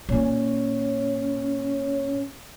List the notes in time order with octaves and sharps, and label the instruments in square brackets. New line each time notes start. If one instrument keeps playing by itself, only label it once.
[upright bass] A#2 [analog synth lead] C#4